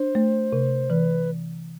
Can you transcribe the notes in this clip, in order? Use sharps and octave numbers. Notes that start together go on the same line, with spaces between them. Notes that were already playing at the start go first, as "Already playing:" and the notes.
Already playing: D4 C5
A3
C3
E3 B4